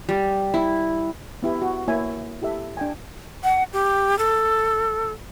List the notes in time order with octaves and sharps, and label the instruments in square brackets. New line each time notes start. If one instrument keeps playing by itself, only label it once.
[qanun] G3
E4
[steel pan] B3 E4 G4
F#4
A#3 E4 C#5 E5 G#5
E4 G4 A4 E5
D4 G5 G#5
[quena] F#5
G4
A4